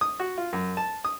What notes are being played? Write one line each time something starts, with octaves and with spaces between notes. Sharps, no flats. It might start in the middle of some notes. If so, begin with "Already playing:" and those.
D#6
F#4
F4
F#2
A5
D#6